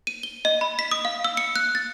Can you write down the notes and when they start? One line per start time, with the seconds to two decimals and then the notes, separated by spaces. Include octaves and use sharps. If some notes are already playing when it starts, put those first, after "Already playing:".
0.07 D#7
0.23 G7
0.45 D#5
0.61 B5
0.79 B6
0.91 D#6
1.05 F5
1.24 E6
1.37 C#7
1.56 F#6
1.75 A6